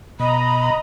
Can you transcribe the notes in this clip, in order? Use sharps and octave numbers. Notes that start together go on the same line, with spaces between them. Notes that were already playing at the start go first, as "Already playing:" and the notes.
B2 D#5 A#5 B5